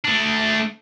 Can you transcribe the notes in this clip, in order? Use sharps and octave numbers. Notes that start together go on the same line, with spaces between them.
A3 D4